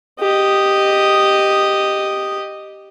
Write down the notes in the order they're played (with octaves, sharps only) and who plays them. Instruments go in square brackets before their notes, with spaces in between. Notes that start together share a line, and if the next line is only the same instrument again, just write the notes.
[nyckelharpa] G4 D#5